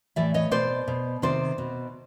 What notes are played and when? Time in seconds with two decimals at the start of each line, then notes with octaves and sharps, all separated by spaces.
0.16 A2 E3 D5 E5
0.34 C#5 D#5
0.51 B2 C5 D5
0.88 B2
1.22 C3 D#3 C5 D5
1.58 B2